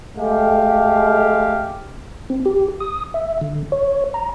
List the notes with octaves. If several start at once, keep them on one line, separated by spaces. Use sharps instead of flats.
G#3 A3 G4 F5
C4
G4
D#6
E5
D3
C#5
A#5